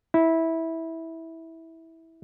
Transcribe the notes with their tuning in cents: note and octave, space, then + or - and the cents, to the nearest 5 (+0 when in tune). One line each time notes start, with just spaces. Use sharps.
E4 -15